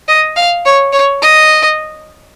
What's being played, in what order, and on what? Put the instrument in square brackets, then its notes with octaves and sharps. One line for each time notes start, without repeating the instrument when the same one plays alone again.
[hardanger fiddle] D#5
F5
C#5
C#5
D#5